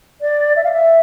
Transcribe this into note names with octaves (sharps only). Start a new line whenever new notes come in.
D5
E5
F5
E5